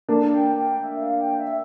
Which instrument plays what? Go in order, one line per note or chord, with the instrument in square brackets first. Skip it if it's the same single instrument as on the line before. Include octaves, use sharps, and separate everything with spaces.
[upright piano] A#3 D4 [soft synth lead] A5
[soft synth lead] G5
G5
E5
F5
G5
E5